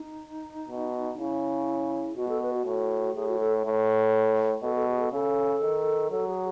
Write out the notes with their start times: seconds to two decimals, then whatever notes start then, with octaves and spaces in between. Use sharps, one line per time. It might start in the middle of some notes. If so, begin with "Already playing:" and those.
Already playing: D#4
0.69 B2
1.18 C#3 E4
2.16 B2 F#4
2.29 A4
2.42 B4
2.53 F#4
2.65 A2
3.15 A2 G#4
3.28 F#4
3.40 A4
3.65 A2
4.63 B2 A4
4.75 A4
4.88 G#4
5.00 A4
5.12 C#3 A4
5.62 D#3
6.11 F#3 A4
6.27 G#4